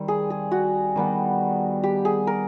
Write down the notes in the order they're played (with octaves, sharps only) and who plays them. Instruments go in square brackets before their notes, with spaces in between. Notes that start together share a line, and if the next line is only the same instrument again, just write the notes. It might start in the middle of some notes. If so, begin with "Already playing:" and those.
Already playing: [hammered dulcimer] D#3 G3 C4
[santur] G#4
G#4
F#4
[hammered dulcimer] D#3 G3 B3
[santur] G4
G#4
A#4